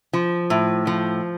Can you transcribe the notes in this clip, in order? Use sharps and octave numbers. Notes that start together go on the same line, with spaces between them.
F3
A2
F3